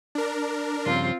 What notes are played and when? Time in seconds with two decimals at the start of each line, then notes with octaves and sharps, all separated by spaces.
0.15 D4 A#4
0.86 G2 C#3 F3 C4 F4